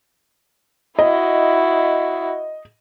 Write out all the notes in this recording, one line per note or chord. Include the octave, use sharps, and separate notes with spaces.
E4 F#4 D#5